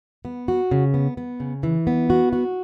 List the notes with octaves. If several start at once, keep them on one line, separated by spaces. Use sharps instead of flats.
B3
F#4
C#3
B3
B3
C#3
E3
B3
F#4
F#4